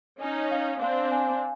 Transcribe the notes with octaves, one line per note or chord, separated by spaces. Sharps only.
C#4 D#4 G#5
F5
C4 D4 F5
G#5